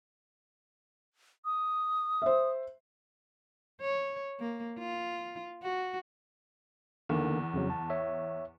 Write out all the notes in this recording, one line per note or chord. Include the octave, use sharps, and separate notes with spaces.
D#6
C5 E5
C#5
A#3
F4
F#4
E2 D3 D#3 A#3
F2 C#3 F#3
A5
C#5 E5